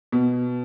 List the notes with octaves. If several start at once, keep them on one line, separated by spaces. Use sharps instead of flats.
B2